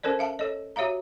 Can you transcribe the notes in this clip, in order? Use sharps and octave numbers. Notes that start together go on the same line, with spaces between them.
C#4 A4 A#4 C5 D5
E5 F5 A5
A4 C#5 D#5
F#4 G4 C#5 E5 F5 A#5